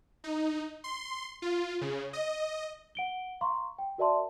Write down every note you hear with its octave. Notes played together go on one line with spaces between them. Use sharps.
D#4
C6
F4
C#3
D#5
F#5 D7 G7
F5 A#5 C6 C#6
G5
F#4 A#4 D5 E5 A5 C6